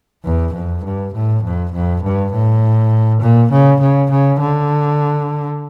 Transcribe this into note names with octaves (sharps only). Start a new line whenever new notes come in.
E2
F2
G2
A2
F2
F2
G2
A2
A#2
C#3
C#3
C#3
D3